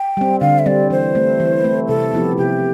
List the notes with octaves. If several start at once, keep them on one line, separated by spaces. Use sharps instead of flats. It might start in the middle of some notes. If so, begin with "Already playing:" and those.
Already playing: G5
G3 C4
D3 F5
E5
G3 C4 D5
E3 C5
A3 C4
E3
A3 C4
C3 A4
F3 B3 E4 G4
C3 G4